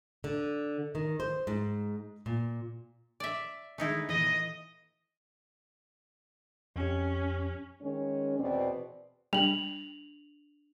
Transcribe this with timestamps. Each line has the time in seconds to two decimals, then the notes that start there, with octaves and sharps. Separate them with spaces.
0.24 D3
0.95 D#3
1.20 C5
1.47 G#2
2.26 A#2
3.20 D5 E5
3.78 D3 D#3 G#3 A3 D#4 E4
4.09 D#2 A#2 E3 D#5
6.76 F2 C#4 G4
7.82 D#3 G#3 C#4
8.39 E2 B2 C4 D5
9.33 G3 D4 F7 F#7